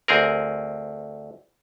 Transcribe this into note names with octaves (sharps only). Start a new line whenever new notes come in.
D2 C4 G#4 A#4